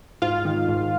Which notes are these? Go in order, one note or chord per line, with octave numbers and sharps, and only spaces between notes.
G#2 F4 F5
D#3
G#2